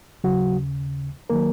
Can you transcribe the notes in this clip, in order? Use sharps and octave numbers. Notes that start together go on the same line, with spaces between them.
D#2 C#3 F#3 F#4
D#3 F#3 A#3 A#4